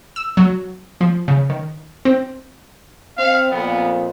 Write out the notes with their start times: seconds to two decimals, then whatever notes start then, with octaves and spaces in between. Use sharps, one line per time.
0.16 E6
0.37 F#3
1.01 F3
1.28 C#3
1.50 D#3
2.05 C4
3.17 C4 F5
3.51 F2 A#2 B3